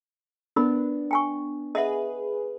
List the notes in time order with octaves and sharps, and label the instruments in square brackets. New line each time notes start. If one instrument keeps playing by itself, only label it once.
[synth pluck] B3 D4 [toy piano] A#4 B5
[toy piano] G5 G#5 C#6
[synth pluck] G#4 B4 [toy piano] D#5 E5 F#5